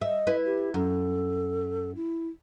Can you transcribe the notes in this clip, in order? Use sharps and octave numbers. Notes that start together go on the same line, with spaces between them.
D#5 E5
E4 B4
G4
F#2 A4
E4